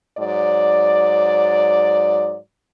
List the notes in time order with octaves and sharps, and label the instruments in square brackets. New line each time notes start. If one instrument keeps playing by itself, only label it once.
[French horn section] G#2 F#3 D5